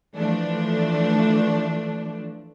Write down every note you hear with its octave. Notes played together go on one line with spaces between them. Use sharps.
E3 F3 A3 D4